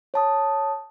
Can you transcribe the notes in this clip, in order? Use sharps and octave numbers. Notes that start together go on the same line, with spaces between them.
C#5 A5 D#6